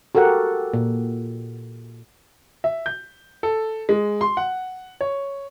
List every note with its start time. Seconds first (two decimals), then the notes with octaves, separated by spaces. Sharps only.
0.15 F#4 G4 A4 A#4 F#5
0.74 A#2
2.64 E5
2.86 G6
3.43 A4
3.89 G#3
4.21 C6
4.37 F#5
5.01 C#5